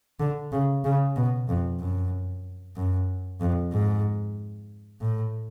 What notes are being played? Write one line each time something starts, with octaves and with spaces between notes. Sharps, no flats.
D3
C#3
C#3
B2
F2
F#2
F#2
F2
G#2
A2